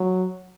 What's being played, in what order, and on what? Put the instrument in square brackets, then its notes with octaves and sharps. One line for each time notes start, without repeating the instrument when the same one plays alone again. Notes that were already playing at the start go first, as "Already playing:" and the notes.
Already playing: [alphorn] F#3